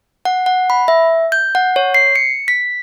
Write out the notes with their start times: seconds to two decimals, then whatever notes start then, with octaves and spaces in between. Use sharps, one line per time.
0.25 F#5
0.46 F#5
0.70 B5
0.88 E5
1.32 G6
1.55 F#5
1.76 C#5
1.94 C7
2.16 C#7
2.48 B6